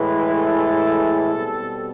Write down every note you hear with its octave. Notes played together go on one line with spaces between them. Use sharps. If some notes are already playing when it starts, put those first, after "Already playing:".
Already playing: A2 E3 G#3 B4
A4
B2 G3 C4